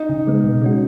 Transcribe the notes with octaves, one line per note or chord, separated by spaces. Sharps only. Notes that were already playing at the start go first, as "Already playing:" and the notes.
Already playing: D#4
C#3
G#3 B3
B2
G#3 C#4 F#4